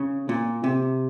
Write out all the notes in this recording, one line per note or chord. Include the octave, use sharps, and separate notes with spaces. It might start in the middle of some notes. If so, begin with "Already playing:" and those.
Already playing: C#3
A#2
C3